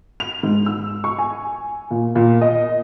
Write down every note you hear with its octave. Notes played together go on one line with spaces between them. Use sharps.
F7
G#2
E6
C#6
G#5
A#2
A#2
D#5